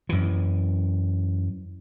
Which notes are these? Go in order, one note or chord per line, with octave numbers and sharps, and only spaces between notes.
F#2 E3